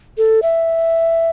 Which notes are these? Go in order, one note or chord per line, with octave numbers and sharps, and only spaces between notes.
A4
E5